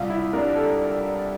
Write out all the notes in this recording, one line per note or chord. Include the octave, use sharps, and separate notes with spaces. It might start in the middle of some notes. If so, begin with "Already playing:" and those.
Already playing: C2 F4
E4
C3 G3 D4 A#4
A4